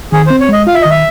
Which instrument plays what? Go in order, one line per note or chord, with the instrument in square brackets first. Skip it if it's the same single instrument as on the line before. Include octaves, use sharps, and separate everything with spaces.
[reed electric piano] D#3 [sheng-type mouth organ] G#4
[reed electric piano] C4 [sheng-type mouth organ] C5
[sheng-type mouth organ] C#5
[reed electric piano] G#3 [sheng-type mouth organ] D#5
[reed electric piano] F4 [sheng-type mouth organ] F5
[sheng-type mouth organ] E5
D#5
[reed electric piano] D#3
[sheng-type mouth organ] E5